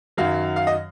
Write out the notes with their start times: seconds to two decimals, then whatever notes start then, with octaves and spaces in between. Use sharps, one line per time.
0.17 F#2 D#3 F#3 F5
0.56 F5
0.67 D#5